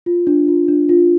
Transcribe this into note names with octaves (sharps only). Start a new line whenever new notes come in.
F4
D4
F4
D4
F4